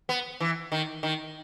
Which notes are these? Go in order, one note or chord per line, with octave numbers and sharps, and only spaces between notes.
B3
E3
D#3
D#3